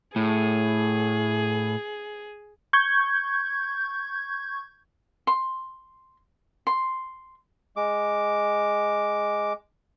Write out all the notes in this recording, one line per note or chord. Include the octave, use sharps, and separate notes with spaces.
A2 G#4
C#6 G6 G#6
C6
C6
G#3 D6